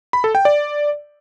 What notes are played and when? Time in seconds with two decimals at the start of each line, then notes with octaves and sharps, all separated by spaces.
0.13 B5
0.24 A4
0.35 G5
0.45 D5